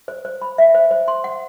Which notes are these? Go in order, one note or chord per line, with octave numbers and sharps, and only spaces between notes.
C5
C5
B5
E5
C5
C5
C6
F#5